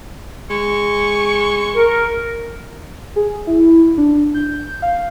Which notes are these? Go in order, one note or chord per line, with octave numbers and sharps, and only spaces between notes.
G#3 C#6
A#4
G#4
E4
D4
G6
F5